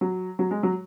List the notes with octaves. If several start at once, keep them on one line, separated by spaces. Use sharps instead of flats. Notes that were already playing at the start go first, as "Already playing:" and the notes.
F#3
F#3
G#3
F#3